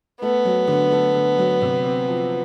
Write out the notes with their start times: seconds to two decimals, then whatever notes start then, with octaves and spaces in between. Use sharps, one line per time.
0.22 A3 B3
0.45 F#3
0.68 D3
0.92 A3
1.14 D3
1.38 F#3
1.62 C3
1.85 C4
2.07 F3